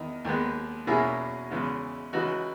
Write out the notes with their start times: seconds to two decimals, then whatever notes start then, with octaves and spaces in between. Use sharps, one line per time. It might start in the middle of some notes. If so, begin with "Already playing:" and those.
Already playing: E2 D#3 D#4
0.25 D#2 D#3 G#3 B3
0.87 E2 B2 A#3 C#4 E4 G#4
1.51 E2 C#3 E3 G#3
2.13 C#2 C#3 E3 D#4 F#4